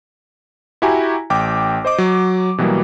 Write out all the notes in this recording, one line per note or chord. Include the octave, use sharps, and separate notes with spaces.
E4 F#4 G4 G#5 A#5
A1 G5 D6
C5 D#5 D6
F#3
B2 E3 F#3 G3 A#3 B3